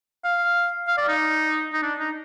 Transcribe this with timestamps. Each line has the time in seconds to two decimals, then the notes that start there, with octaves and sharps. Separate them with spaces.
0.24 F5
0.88 F5
0.98 D5
1.08 D#4
1.73 D#4
1.83 D4
1.99 D#4